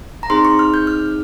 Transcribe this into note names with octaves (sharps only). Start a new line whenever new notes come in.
A#5
C4 D#4 G#4 C6
C#6
F6
G6
F6